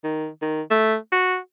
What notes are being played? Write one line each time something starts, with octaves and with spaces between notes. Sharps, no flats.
D#3
D#3
A3
F#4